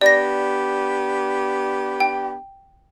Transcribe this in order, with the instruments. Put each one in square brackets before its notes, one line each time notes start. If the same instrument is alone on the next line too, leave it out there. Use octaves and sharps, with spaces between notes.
[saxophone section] B3 D4 G4 [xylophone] D5 A#6
[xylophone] G5